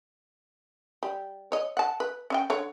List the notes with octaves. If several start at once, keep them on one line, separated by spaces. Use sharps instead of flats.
G3
C#5 D#5
F#5 A5
B4
C#4 E5 G5
D3 C#5